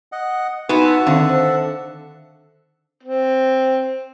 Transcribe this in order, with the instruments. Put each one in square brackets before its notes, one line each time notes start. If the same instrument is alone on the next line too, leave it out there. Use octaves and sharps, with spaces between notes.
[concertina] D#5 F#5
[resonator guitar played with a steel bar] B3 F#4 [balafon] D#4 [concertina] E4 G#5 C6
[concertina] E5 F#5 A5
[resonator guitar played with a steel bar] D3 [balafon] D#3 C4 F5
[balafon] C5
[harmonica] C4